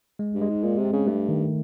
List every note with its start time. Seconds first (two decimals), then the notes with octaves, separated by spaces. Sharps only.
0.19 G#3
0.34 G2
0.41 G#3
0.49 G#2
0.63 A#2 G#3
0.78 C3
0.85 C4
0.93 C#3
1.07 G2 A3
1.29 D#3